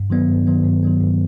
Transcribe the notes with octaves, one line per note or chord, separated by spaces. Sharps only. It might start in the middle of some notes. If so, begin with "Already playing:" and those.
Already playing: G2
D#3 F#3 B3
G2
D#3 F#3 B3
G2
D#3 F#3 B3
G2